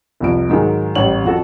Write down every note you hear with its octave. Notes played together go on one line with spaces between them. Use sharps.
C2 F2 D7
G#2 D#3 F#3 G#3
A1 G3 C#5 F#5 C#6 F#7
F2 F#4 A4